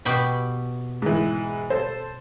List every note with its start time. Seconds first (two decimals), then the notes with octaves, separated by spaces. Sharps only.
0.05 B2 G4 B5
1.02 G#2 E3
1.70 A4 C5